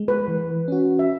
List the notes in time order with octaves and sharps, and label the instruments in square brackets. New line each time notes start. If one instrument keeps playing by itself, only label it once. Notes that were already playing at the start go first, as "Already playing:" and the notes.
Already playing: [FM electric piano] G#3
[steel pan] B4
[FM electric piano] E3
C#4 F#4
[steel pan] E5